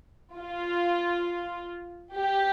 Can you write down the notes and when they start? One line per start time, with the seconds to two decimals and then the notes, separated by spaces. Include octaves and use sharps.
0.37 F4
2.15 G4